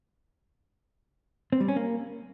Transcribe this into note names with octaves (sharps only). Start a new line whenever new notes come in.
C4
G3
C#4
A#3